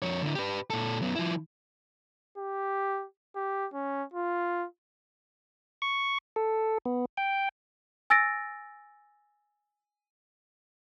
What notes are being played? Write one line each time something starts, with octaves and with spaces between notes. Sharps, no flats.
F2 C#5
D3 E4
G4 B4
A#2 A4
F#2 B3
F3 E4
G4
G4
C#4
F4
C#6
A4
B3
G5
G#5 E6 A6 A#6 D7